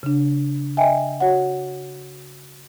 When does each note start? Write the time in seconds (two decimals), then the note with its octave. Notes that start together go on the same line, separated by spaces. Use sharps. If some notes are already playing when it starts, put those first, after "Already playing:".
0.03 C#3 D4
0.77 D#5 E5 G5 G#5
1.20 F#4 C#5 F#5